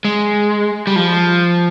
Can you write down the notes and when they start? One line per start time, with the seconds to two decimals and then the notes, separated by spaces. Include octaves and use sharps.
0.05 G#3
0.87 G3
0.96 F3